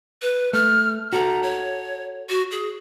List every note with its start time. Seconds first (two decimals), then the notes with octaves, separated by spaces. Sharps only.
0.22 B4
0.53 A3 F6
1.13 F#4 A4 A#5
1.43 C#5
2.29 F#4
2.51 G#4